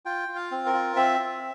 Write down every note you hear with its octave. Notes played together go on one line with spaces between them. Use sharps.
F4 G5
F4
F5
C4
A#4
F4
C4 E5
F4